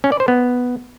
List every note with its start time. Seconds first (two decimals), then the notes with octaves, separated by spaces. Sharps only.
0.04 C#4
0.12 D5
0.20 C5
0.28 B3